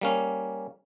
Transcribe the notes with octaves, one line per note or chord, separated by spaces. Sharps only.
G3 A#3 C#4